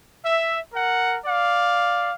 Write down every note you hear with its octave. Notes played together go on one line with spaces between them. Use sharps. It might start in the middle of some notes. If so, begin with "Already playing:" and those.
E5
A#4 F#5
D5 F5